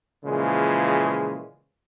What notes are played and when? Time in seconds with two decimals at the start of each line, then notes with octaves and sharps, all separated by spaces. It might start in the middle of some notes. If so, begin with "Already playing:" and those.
0.25 A#2 C#3 E3 F3 G#3